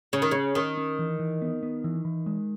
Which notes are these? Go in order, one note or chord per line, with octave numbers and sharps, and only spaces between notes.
C#3 C#4
D#3
C#3 C#4
D#3 C#4
C#4
E3
E3
B3
B3
E3
E3
G#3